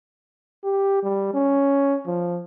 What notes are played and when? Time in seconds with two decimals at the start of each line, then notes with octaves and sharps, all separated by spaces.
0.64 G4
1.03 G3
1.34 C#4
2.06 F3